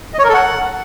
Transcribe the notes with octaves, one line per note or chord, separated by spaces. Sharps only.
D#5
C#5
A#4
A4
F#5